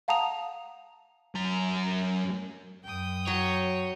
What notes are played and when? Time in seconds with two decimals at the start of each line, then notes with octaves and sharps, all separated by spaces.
0.08 F5 F#5 A5 A#5 D#6 F7
1.35 F#2 A#5
2.84 F#2 G5 D#6
3.27 F#3 C#5